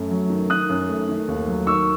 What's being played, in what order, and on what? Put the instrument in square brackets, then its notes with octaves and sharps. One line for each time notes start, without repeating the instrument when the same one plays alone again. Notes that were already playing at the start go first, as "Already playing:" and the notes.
Already playing: [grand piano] F#2 A3
F#3
D#3
D#3 D#6 F#6
F#2
A3
D#3
D#2
F#3
D#3 C#6 E6